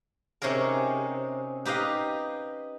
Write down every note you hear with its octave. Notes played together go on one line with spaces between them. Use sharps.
C3 C#4 D#4 G#4 A#4
D#4 G4 B4 D#5 F5